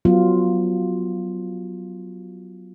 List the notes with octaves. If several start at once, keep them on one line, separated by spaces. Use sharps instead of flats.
F#3 B3 F4